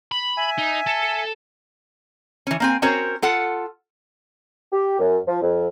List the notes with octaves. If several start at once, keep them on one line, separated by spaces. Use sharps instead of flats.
B5
E5 G#5
D#4
A4
E3 C#4
A#3 C4 G#5
C4 C#4 F#4 A#4 C5 C#5
F4 A4 F#5
G4
F#2
F3
F2